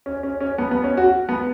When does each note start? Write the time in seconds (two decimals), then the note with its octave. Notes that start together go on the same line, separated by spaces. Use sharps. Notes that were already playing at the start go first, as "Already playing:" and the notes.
0.06 C#4
0.23 C#4
0.41 C#4
0.58 B3
0.71 B3
0.84 C#4
0.97 F#4
1.29 B3